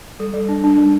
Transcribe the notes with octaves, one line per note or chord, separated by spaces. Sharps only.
G3 A4
G3
D4
D4
G3